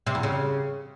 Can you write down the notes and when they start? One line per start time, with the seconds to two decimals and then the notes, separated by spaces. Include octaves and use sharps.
0.06 C3
0.15 E2
0.23 C#3